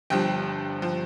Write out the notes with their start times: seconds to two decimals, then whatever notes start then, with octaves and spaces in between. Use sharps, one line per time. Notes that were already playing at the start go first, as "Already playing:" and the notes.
0.10 G1 G2 F3 G5
0.82 F3